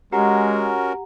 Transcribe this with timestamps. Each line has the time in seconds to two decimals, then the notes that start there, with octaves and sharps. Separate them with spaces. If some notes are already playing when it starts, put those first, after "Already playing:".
0.12 G#3 C#4 F#4 G4 A#4 F#5 A#5